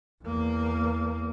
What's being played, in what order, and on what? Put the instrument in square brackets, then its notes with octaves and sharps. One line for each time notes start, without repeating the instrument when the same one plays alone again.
[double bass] E2 A#3